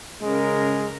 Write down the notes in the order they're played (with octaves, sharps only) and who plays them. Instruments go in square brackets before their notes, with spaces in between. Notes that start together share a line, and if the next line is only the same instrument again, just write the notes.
[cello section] C#3 A#4 [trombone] G#3